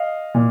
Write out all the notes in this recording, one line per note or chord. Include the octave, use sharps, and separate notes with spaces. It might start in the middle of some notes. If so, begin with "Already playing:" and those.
Already playing: D#5 F5
A#2